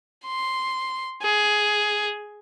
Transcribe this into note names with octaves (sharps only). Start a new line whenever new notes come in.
C6
G#4